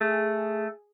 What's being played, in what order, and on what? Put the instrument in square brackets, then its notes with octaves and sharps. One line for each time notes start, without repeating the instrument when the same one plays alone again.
[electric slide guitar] A3 [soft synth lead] G#4